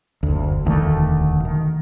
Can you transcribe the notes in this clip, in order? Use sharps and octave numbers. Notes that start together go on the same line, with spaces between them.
F#1 D2
E1 D2 D#3 A3
D#3